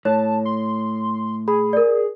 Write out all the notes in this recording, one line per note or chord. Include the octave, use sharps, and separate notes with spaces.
A2 C#5 A5
C6
G#4 B5
A#4 D5